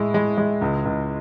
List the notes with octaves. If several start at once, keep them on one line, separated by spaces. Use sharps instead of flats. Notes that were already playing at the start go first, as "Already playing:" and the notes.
Already playing: A2 G#3 E4
G#3
G#3
C#2
C#2